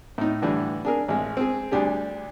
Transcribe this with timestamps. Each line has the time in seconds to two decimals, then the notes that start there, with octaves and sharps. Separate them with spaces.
0.18 A2 D#4
0.42 A2 D3 E3 G3 D4
0.85 D4 G#4 A#4
1.08 A1 G#3
1.37 C4 G#4
1.72 D2 G3 D4 G4 G#4